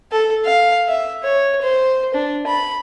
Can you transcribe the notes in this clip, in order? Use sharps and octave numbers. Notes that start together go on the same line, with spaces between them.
A4
F5
E5
C#5
C5
D4
B5